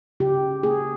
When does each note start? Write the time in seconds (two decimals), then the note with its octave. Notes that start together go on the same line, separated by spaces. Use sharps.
0.20 C#3 G4
0.63 A#3 G#4